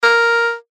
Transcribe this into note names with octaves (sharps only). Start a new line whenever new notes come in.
A#4